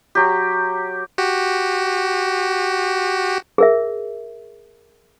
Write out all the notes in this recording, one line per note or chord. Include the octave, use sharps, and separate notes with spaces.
F#3 G4
F#4 G4
G#4 A#4 E5